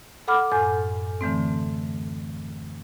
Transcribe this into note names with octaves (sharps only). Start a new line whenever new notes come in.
A4 F#5 B5 D6 F6
F#2 A2 A4 G#5 G6
D3 E3 A3 C4